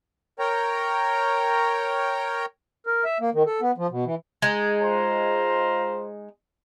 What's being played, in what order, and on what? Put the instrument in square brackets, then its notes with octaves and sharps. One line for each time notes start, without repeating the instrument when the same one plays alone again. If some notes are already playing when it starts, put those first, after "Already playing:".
[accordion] A#4 C#5 G5 A#5
[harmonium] A#4
E5
A#3
D#3
A4
B3
F3
B2
E3
[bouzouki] G#3 D#4
[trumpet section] F4 C5 A#5